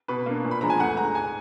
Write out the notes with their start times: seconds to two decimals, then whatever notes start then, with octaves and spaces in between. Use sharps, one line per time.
0.08 B2 B4
0.26 A#3 D4
0.44 A#2
0.51 B5
0.61 F3 G#3 B3 D4 A#5
0.70 G#5
0.80 D2 F#5
0.97 D3 G#3 A#5
1.15 G#2 G#5